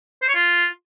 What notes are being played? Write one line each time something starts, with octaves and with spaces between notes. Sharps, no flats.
C5
C#5
F4